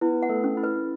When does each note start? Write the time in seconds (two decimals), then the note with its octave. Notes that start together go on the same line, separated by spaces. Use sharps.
0.01 B3 E4 B4
0.23 F#5
0.29 A3 A4
0.44 C#4
0.57 E4
0.64 B4